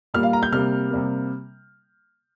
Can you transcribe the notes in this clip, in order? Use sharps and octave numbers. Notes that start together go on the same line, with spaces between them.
A#2 G3 A#3 F6
F5
A#5
G6
C3 G3 A#3 F6
C3 G3 A#3